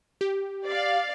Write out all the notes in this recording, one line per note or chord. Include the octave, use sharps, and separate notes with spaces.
G4
D5 F5